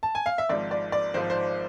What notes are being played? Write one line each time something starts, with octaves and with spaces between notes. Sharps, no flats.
A5
G#5
F5
E5
G#1 G#2 F3 D5
D5
D5
G#1 G#2 F3 C5
C5